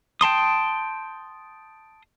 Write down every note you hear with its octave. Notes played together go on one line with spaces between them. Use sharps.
G5 A5 C6 D#6